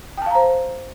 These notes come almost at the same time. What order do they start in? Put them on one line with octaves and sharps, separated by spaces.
G5 A5 F5 A#5 C5